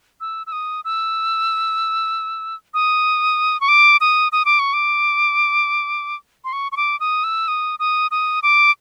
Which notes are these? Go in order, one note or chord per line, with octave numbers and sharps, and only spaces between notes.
E6
E6
D#6
E6
D#6
C#6
D6
D#6
D#6
D6
C#6
D6
C6
C#6
C#6
D6
D#6
E6
D#6
D#6
D#6
D6